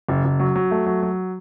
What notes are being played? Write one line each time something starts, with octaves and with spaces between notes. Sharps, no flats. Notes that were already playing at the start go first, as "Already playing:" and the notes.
F#1
F#1
F#3
F#3
A3
F#3
F#3